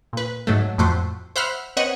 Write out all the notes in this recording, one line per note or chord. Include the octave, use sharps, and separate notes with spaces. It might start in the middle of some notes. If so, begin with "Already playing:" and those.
A#2 B4
G#2 F#3 A3
F2 A2 A3 F#4 C5
C5 E5 F#5 B5 F6
C4 B4 C#5 D#5 F#5 D#7